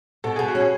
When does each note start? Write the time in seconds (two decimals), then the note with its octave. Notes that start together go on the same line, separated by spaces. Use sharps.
0.24 B2 A4
0.36 B2 G#4
0.48 F#4
0.55 C#4
0.61 G#4